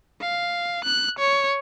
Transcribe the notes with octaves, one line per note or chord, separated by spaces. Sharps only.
F5
F#6
C#5